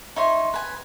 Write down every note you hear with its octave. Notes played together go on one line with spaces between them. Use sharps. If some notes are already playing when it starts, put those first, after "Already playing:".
D#4 C#5 E5 C6
B4 G#5